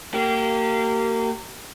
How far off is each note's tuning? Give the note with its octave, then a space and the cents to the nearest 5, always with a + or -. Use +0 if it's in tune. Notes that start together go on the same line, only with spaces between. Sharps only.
A#3 -25 G4 -30